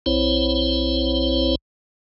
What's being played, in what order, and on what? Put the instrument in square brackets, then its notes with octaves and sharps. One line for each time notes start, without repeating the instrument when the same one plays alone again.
[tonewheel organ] B1 C4 E4 C5 C#5